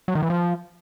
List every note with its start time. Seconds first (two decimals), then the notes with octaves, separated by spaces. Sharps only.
0.08 F#3
0.15 D#3
0.23 E3
0.30 F3